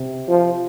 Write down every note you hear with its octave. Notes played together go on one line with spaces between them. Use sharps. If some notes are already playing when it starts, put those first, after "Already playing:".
Already playing: C3
F3